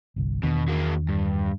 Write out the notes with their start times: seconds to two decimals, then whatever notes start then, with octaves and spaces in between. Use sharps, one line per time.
0.16 G1 C2
0.43 E2 B2 D#3 D4
0.68 F#3 A#3
1.09 G2